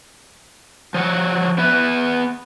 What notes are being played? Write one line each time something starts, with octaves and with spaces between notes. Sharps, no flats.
F3 F#3 F#5
B3 B4 E5